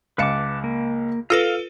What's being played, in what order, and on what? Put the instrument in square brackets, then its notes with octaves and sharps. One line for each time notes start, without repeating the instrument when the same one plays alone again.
[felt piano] C#2 F5 C#7 [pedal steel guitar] B4 A5 D6
[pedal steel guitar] A#3
[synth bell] F4 A4 B4 [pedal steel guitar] F5 [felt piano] E6 A#6